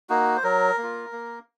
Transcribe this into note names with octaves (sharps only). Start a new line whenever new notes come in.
A#3 D#4 F#4
C5
F#3 A#4
A#3
F4
A#3